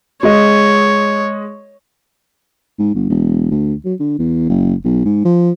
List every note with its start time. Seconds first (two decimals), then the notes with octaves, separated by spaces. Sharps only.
0.23 G#3 C#5 D#5
2.79 G#2
2.95 G1
3.10 E1
3.51 D2
3.85 F#3
3.99 D3
4.19 E2
4.49 F#1
4.84 B1
5.05 G#2
5.25 F3